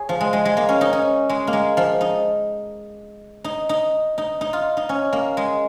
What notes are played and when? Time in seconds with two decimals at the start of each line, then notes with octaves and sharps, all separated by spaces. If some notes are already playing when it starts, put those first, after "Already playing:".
Already playing: G#4 C#5
0.09 F3
0.21 G#3
0.33 G#3
0.45 G#3
0.57 A#3
0.69 C#4
0.81 D#4
0.93 C#4
1.29 G#3
1.47 A#3
1.53 G#3
1.77 F3
2.01 D#4
3.44 D#4
3.69 D#4
4.18 D#4
4.41 D#4
4.53 F4
4.77 D#4
4.89 C#4
5.13 A#3
5.37 G#3